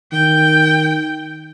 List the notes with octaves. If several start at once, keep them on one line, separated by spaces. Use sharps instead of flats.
D#3 G5